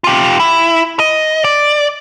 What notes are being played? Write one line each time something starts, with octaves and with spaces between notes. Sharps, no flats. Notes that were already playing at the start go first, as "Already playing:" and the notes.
F4 G4
E4
D#5
D5